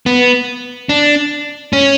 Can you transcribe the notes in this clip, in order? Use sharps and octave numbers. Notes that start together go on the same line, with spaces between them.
B3
D4
C#4